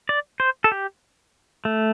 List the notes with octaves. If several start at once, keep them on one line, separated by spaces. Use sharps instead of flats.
D5
C5
A4
G4
A3